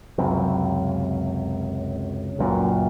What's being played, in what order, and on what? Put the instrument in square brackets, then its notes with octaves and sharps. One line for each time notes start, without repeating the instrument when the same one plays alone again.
[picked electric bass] C#2 F#2 C3
C#2 F#2 A#2